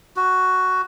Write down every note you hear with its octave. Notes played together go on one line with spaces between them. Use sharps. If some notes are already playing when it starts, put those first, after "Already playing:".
F#4